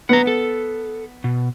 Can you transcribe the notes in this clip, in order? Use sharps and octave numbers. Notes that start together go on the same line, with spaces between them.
B3 F#5 A#5
A4
B2